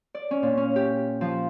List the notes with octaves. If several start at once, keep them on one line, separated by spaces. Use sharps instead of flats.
D5
C#4
A#2
C#4
G4
F3